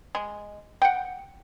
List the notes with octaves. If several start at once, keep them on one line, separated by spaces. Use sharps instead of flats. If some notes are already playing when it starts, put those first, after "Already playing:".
G#3
F#5 G5